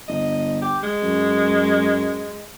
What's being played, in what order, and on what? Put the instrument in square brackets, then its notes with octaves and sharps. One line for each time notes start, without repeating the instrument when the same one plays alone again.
[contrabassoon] G1 [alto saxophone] D#5
[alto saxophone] G4
G#3
[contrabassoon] F#2